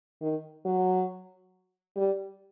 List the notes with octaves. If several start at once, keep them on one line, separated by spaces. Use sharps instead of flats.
D#3
F#3
G3